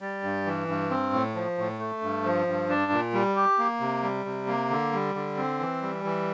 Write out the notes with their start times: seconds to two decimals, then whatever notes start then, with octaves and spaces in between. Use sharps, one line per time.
0.01 G3
0.23 G2
0.46 E3
0.68 G2
0.90 C4
1.13 A2
1.35 F3
1.58 A2
1.79 A3
2.02 G2
2.24 F3
2.47 G2
2.69 D4
2.92 A#2
3.14 G3
3.36 G4
3.59 A#3
3.80 C3
4.03 G3
4.25 C3
4.47 A#3
4.70 D3
4.93 G3
5.15 D3
5.37 C4
5.59 E3
5.82 G3
6.04 E3